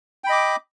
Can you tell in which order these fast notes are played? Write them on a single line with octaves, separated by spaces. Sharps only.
G5 B5 D#5 D6